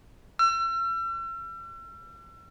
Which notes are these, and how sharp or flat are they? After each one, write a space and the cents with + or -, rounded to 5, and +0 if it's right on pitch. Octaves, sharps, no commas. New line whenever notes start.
E6 +40